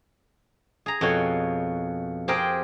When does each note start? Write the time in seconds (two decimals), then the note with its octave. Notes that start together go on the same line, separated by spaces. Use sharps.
0.86 G#4 A#5
1.01 F2 B2 C#5
2.28 C4 G4 G#4 A#4 G5